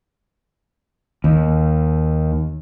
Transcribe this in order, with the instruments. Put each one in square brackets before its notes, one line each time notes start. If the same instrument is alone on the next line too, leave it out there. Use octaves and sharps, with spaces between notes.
[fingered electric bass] D#2